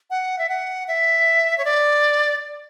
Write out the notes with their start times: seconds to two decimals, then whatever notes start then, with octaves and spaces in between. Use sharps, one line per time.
0.10 F#5
0.38 E5
0.49 F#5
0.88 E5
1.58 C#5
1.65 D5